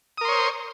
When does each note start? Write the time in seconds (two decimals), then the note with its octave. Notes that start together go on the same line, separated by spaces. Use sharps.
0.18 D#6
0.21 A#4
0.25 C6
0.28 C#5
0.32 C5